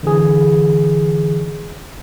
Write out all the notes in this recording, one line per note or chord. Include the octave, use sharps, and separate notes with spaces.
D3 E3 G#4